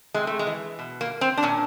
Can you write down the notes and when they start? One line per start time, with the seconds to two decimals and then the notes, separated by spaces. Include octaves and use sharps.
0.14 C3 G#3
0.27 A3
0.39 G#3
0.47 E3
0.79 B2
1.01 A#3
1.21 C4
1.38 D4
1.43 A#2 C#4